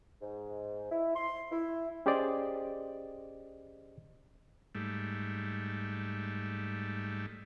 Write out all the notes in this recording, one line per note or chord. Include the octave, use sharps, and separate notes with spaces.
G#2
E4
C6
E4
C#4 G4 G#4 C5 D5 D#5
G#2 G3 A3